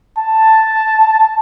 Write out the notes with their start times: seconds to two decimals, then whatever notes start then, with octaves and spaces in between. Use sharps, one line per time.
0.18 A5